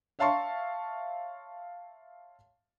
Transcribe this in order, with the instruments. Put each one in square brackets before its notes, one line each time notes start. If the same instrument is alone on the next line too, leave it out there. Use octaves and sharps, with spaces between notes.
[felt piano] C#5 E5 F5 A5 C6 C#6